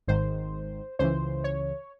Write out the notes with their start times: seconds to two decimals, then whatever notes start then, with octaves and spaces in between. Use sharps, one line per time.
0.07 G#1 G#2 D#3 C5
0.99 C#2 C#3 E3 C5
1.44 C#5